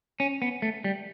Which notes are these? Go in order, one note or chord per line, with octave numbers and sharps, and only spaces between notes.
C#4
B3
A3
G3